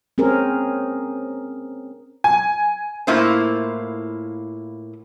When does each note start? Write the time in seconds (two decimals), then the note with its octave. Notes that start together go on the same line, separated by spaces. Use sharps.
0.18 C4 C#4 G#4 A#4
2.24 G#5
3.07 A2 A#3 E4 F4 C5